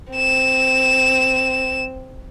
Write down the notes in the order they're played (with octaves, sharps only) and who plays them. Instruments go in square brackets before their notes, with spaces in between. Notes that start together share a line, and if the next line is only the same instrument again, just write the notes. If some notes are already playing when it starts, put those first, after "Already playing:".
[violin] C4 E7